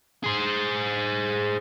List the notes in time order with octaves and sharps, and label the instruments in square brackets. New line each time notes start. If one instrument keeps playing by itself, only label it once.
[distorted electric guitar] G#4 C5